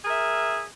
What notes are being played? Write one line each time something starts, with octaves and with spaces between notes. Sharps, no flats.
G#4 A#4 E5